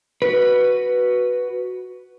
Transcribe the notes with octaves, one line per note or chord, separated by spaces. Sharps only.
F#4 B4